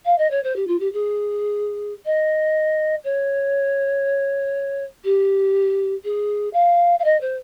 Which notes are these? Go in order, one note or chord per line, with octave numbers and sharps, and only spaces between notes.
F5
D#5
C#5
C5
G4
F4
G4
G#4
D#5
C#5
G4
G#4
F5
F5
D#5
C5